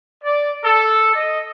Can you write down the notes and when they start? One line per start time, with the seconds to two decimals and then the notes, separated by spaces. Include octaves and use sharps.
0.24 D5
0.64 A4
1.15 D#5